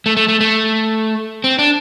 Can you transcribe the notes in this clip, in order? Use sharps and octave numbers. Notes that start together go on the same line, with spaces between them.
A3
A3
A3
A3
C4
D4